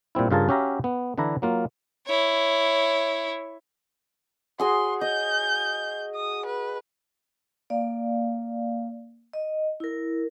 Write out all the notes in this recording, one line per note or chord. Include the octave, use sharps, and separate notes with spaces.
A#2 G3 C4 E4
G2 C#3 F4 G#4 A#4 A5
C#4 F#4 G4 E5 F5 A#5
B3
D3 E3 D4 E4 A#5
F#3 A#3 F4
E4 C#5
F#4 G#4 G#5 C6
D#5 G6
D#6
B4
A#3 D5 F5
D#5
E4 A#4